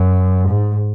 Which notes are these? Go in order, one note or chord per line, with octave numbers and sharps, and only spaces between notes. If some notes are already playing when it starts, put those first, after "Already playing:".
Already playing: F#2
G#2